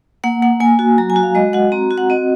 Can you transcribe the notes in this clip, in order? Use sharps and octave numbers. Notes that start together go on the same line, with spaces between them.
A#3 F#5
A#3 F#5
A#3 G#5
F#4
F#3 A#5
G#5
F#4
F5
G#3 D#5
F#4 F#5
C4 A#5
F#4
F#5
C4 D#5